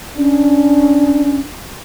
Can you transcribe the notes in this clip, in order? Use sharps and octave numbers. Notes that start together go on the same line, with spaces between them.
C#4 D4